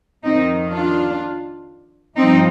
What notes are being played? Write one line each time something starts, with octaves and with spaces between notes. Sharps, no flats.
F2 D#3 C4 D#4
D4 F4
G2 F3 C4 D#4